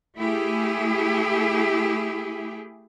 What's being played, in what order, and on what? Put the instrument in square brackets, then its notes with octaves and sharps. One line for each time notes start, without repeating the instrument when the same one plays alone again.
[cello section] A3 E4 G4 G#4